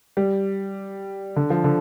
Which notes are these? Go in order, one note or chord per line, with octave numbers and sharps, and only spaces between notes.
G3
D3
F3
D3